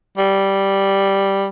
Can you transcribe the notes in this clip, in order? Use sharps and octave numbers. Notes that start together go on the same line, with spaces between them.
G3